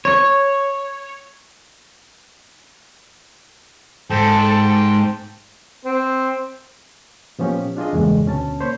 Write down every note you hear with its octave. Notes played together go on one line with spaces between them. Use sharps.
C#5
G#2 A4 C5 G5 A5
C4
A#2 F3 B3 C#4 G4
D4 F4 G#4 D#5
E2 G2 A#2 C#3 G#3 A3
D2 B2 C#4 A5
A#3 C5 C#5 B5 G6